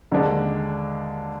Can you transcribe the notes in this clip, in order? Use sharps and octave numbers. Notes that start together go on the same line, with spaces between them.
D#2 D3 G#3 D4